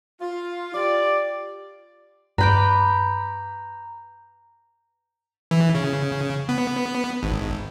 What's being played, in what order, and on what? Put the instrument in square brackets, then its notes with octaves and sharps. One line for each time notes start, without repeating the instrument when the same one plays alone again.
[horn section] F4
F4 G4 D5
[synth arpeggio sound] G2 [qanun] B4 B5 D6 [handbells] A#5 G6
[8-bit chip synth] E3
C#3
B3
G#1